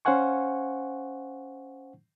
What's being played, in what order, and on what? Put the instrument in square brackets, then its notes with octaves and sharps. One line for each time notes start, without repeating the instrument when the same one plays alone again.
[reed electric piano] C#4 C5 F5 F#5 G#5 C#6